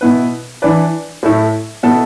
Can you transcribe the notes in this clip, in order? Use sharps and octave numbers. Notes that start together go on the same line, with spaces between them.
B2 B3 E4 B4
E3 D4 B4 D5
A2 A3 E4 A4
B2 B3 E4 A4